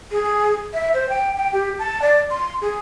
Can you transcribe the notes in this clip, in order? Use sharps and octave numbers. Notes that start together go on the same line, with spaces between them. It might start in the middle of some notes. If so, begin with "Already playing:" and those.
G#4
E5
C5
G5
G5
G4
A5
D5
C6
G#4